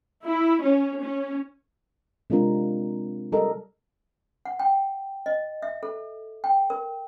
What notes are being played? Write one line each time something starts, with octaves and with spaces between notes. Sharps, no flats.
E4
C#4
C#4
C3 G#3 C4 D4 F4 A#4
G3 A4 A#4 D#5
F#5
G5
D#5
E5
A4
G5
A#4